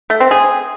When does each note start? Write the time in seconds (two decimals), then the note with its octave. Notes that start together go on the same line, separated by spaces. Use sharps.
0.10 A3
0.20 C4
0.31 G#4